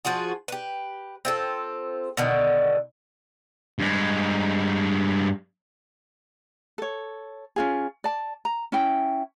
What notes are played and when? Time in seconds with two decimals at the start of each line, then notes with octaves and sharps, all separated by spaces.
0.05 F3 F4 F#4 G#4
0.48 G4 B4
1.25 C4 F4 A4
2.17 B2 D3 D#3
3.79 G2 G#3
6.78 A4 C#5
7.56 C#4 F4 G#4
8.04 D5 A5
8.45 A#5
8.72 C#4 E4 G5